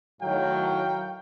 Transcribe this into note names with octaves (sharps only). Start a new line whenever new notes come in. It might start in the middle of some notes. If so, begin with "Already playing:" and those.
A2 D#3 F#3 F5 G5